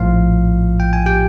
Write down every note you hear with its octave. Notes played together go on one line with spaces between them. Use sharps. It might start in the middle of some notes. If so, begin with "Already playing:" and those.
Already playing: A#1 A2 F3 F4 F5
G5
G#5
G4 G5